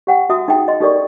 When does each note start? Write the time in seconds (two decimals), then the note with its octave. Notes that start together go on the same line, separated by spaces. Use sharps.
0.07 G4 F#5 G5
0.30 F#4 E5 A5 D#6
0.48 D#4 G#4 E5 G5 A5
0.68 D#5 C6
0.80 D#4 G4 A4 A#4 D5 C#6